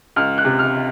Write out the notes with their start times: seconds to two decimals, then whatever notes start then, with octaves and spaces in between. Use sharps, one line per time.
0.16 C#2 F6
0.38 F#6
0.45 C3
0.59 F6